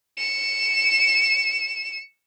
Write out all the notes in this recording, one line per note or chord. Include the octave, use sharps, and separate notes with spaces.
C#7 E7